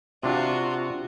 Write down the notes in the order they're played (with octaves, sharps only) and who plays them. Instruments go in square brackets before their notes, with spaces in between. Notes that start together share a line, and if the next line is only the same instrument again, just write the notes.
[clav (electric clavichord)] C3 D4 [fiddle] F4 F#4